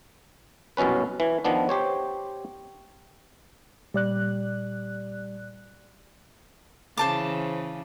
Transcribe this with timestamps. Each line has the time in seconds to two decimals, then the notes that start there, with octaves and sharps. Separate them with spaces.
0.77 C2 F#2 B2 C#4 B4
1.20 E3
1.45 D#3 F3 B3 D4
1.69 G4 C5 C#5
3.94 A#2 G3 D5 F#6
6.97 C#3 E3 C5 A5 D6